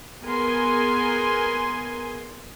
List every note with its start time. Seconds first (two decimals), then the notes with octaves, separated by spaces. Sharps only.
0.24 B3 G#4 A#4 G#5 C6